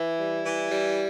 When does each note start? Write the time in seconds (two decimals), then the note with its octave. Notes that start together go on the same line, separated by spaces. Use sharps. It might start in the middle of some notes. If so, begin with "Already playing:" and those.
Already playing: E3 E4
0.19 G3
0.45 E3
0.71 G3